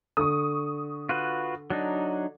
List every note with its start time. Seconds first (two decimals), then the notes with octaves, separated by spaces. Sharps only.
0.17 D3 C#6 D#6
1.09 F4 F#4 B4
1.70 F#3 D4 D#4